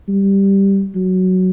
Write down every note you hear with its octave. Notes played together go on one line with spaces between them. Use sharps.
G3
F#3